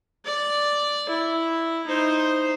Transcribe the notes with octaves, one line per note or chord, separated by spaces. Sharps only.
D5
E4
D#4 C5